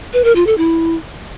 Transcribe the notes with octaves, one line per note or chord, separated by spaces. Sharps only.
B4
A#4
F4
A4
E4